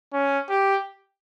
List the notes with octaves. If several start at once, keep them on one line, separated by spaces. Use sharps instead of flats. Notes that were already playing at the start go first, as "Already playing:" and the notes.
C#4
G4